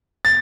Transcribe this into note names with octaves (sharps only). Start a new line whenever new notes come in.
A6